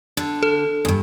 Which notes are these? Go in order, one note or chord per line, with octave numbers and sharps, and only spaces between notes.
D3
A4
D2 G2